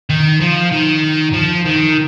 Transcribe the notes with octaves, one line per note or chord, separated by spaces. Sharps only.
D#3
F3
D#3
F3
D#3